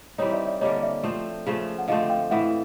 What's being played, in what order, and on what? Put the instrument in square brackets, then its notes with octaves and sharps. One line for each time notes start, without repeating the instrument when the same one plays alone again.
[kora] E3 G3 C4 D#4 [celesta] C#5 D#5
[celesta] D5 E5
D5 E5
[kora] D3 G3 A#3 [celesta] C#5 D#5
[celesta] D5 E5
[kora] F3 A3 C4
C#3 F3 A3
[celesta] F#5
[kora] D3 F3 A3 C4 [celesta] D#5 F5
[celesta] F5 G5
[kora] A2 E3 A3 [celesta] E5 F#5